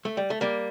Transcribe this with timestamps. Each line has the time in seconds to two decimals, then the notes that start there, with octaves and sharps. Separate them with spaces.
0.05 A3
0.17 G3
0.30 A3
0.41 G3 A#3